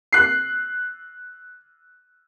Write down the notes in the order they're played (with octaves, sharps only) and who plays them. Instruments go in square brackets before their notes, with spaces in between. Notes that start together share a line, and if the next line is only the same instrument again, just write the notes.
[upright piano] F#6 C7